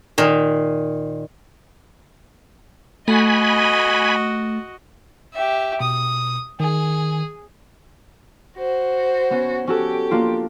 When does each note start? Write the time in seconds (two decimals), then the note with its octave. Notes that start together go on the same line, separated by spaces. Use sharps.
0.18 A#2 D#3
3.08 A3 F#4 D#5 G#5 B5
5.33 G4 E5
5.80 B2 D#6
6.60 D#3 G#4
8.57 F#4 C5
9.30 B3 C#4
9.67 C#4 F#4 G4 A4
10.11 A#3 D4 F4